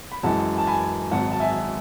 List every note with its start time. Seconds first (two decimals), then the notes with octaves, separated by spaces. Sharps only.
0.12 B5
0.23 F#2 E3 G#3 F#5 A5
0.58 A5
0.67 G#5 B5
1.11 G#1 G#2 F#3 F#5 A5
1.32 A5
1.40 E5 G#5